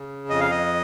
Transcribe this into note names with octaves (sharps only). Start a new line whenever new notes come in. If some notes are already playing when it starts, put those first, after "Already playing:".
Already playing: C#3
F2 D#5
F5
D#5